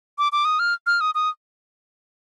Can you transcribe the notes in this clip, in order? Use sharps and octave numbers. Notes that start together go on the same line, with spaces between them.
D6
D6
D#6
F6
F6
D#6
D#6